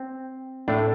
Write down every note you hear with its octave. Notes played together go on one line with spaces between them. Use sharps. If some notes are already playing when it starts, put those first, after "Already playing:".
Already playing: C4
A2 A3 D4